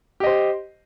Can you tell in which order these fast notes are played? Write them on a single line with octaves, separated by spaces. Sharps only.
G4 D#5 C5